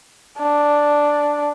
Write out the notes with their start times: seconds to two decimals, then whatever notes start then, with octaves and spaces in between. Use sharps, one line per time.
0.39 D4